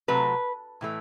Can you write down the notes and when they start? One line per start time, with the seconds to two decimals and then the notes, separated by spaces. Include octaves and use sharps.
0.08 C3 F#3 A3 B4
0.81 A2 E3 A3